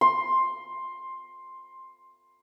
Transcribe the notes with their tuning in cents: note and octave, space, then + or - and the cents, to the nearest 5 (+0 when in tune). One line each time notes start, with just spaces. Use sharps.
C6 +10